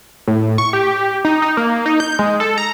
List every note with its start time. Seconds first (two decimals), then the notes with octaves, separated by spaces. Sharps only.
0.28 A2
0.58 C#6
0.73 G4
1.25 D#4
1.42 D#4
1.57 A#3
1.86 D#4
2.00 G6
2.19 G#3
2.40 A4
2.58 A#5